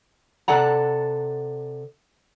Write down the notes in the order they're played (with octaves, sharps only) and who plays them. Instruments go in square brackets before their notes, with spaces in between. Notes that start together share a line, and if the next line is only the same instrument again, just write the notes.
[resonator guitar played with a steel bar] C3 A4 D5 F#5 A#5